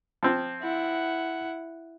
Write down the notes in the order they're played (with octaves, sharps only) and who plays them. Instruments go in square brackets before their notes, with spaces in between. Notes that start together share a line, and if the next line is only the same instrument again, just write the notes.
[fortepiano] F3 C4
[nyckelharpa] E4 F#5